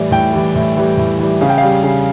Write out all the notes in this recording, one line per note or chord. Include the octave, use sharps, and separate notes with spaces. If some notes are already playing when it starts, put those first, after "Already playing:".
Already playing: A2 E3 G3 D5
A2 G5
E3 G3
A2
E3 G3
A2
E3 G3
C#3 F5
G5
F5
G3
C#3